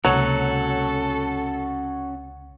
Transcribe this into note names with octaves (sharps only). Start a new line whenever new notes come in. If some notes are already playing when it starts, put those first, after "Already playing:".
C#2 C3 F#3 A#3 C#4 F#4 A4